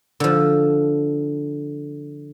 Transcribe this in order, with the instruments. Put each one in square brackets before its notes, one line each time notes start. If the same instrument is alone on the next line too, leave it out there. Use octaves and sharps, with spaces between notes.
[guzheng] D3 F3